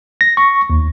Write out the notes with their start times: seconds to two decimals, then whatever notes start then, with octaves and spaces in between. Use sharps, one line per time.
0.21 A#6
0.37 C#6
0.70 D#2